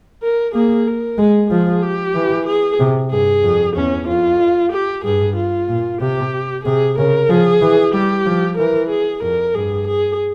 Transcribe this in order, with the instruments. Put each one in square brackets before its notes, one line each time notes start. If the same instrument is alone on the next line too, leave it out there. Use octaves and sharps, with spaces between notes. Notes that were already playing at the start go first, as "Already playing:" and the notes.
[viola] A#4
[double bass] A#3 [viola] G#4
[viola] A#4
[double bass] G#3 [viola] G#4
[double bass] F3 [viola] G#4
[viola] G4
[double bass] E3
[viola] G#4
[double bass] C3
[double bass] G2 [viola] G#4
[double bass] F2
[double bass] E2 [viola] C#4
[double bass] F2 [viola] F4
[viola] G4
[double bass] G2 [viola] G#4
[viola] F4
[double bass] A#2
[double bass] C3 [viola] G4
[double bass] C3 [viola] G#4
[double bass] C#3 [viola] A#4
[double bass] F3 [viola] G#4
[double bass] E3
[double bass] G3 [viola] G4
[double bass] F3
[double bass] E3 [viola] A#4
[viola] G#4
[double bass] F2 [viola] A#4
[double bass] G2 [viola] G#4
[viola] G#4